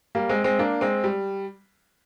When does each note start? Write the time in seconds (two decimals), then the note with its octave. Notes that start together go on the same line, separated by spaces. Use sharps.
0.15 G3 A#3
0.29 G#3 C4
0.44 G#3 C4
0.59 A#3 D4
0.81 G#3 C4
1.04 G3